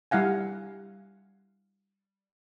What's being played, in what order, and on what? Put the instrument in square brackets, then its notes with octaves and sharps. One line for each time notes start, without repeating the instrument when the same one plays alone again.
[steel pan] G3 E4 F5 F#5 G#5